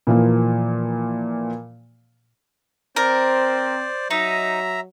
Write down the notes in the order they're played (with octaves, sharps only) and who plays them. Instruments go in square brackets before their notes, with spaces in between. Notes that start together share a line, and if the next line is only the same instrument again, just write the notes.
[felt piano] A#2 E3 F3 A#3
[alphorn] C4 [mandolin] A#4 [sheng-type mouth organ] C5 D5
[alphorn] F#3 [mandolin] D#4 [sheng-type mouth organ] E5 A#5